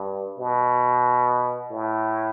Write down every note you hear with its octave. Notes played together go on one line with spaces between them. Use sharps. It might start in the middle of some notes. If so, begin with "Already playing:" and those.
Already playing: G2
B2
A2